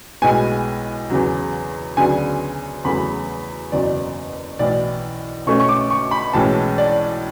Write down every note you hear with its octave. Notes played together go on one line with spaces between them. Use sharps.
B1 A2 G#3 B3 G#5
E2 C#3 F#3
D2 C#3 F#3 B3 D4 G#5
E2 C#3 F#3 A3 B5
F#1 E2 B2 F#3 D5
B1 A2 E3 D5
B1 B2 A3 C#4 C#6
C#6
D6
C#6
B5
B1 A2 E3 G#3 C#4 A5
D5